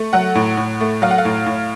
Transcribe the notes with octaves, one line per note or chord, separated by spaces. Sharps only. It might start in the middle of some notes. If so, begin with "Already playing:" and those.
Already playing: A3
F#3 F#5
A2
A2
A3
F#3 F5
F#5
F5
A2
A2